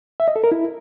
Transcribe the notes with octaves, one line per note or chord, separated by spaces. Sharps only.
E5
D#5
A4
A#4
E4